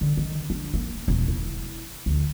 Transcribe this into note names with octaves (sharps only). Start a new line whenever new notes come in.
D3
D#3
D4
A#3
E1
E4
D2